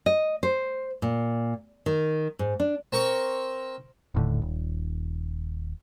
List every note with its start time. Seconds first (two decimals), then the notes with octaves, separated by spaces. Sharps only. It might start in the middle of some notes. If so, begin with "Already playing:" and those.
0.06 D#5
0.43 C5
1.02 A#2
1.86 D#3
2.39 G#2
2.60 D4
2.93 C4 A#4 C#6
4.14 D#1 A2 D3
4.42 D#1